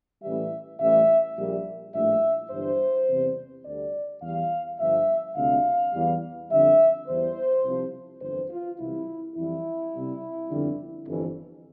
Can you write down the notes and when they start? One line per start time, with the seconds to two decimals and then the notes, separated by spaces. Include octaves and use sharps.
0.23 A1 A2 E3 G3 E5
0.80 A1 A2 E3 G3 E5
1.37 A#1 A#2 G3
1.94 A#1 A2 G3 E5
2.51 G1 G2 E3 G3 C5
3.09 E2 C3 E3 G3
3.65 D2 D3 G3 D5
4.22 E2 E3 G3 F5
4.79 G1 G2 F3 E5
5.36 D2 C3 G3 F5
5.94 E2 E3 G3
6.50 F2 D3 G3 E5
7.08 E2 E3 G3 C5
7.64 C2 C3 F3
8.21 G1 F2 E3 C5
8.50 F4
8.79 C2 C3 E3 G3 E4
9.36 F2 E3 G3 E4
9.93 C2 C3 G3
10.50 G1 F2 D3 G3
11.07 G1 F2 E3